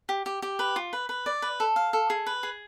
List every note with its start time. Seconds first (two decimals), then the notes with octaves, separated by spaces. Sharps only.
0.09 G4
0.26 G4
0.42 G4
0.59 B4
0.76 F4
0.93 B4
1.09 B4
1.26 D5
1.42 B4
1.60 A4
1.76 F5
1.93 A4
2.10 G#4
2.26 B4
2.43 G#4